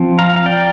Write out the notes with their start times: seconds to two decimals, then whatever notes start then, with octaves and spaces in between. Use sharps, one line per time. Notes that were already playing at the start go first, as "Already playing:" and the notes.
Already playing: F3 C4
0.19 F5 A#5
0.36 F5
0.46 D5 G5